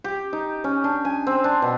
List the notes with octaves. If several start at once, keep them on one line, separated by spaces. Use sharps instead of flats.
G4
D#4
C#4
D4
G#5
C4
D4
B2